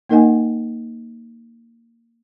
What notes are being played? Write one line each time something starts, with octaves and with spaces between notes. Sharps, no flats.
A#3 D#4 A#4 D#5 F#5 G#5